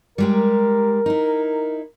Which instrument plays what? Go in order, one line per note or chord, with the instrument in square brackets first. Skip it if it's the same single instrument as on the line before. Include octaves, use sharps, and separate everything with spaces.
[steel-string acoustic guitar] G3 G#3 G4 [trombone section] A#4
[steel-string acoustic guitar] D#4 E4